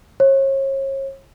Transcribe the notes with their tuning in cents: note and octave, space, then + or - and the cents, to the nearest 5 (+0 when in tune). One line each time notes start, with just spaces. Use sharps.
C#5 -40